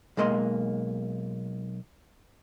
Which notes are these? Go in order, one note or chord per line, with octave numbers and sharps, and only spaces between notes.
B1 G#3 A#3 D#5 C6